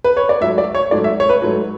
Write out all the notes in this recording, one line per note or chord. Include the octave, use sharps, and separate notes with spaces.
B4
C#5
D5
G#2 F#3 A3 E5
D5
C#5
G#2 F#3 A3 D5
E5
C#5
B4
G#2 F#3 A3